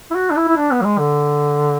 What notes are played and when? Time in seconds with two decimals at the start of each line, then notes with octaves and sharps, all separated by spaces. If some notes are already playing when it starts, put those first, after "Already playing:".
0.11 E4
0.15 F#4
0.30 D4
0.36 E4
0.48 E4
0.57 D4
0.71 B3
0.81 F#3
0.85 G#3
0.99 D3